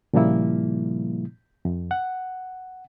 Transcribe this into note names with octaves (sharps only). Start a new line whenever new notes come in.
A#2 C#3 F3 G3 A#3 E4
F2
F#5